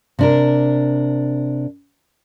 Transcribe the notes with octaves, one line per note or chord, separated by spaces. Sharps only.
C3 D4 A#4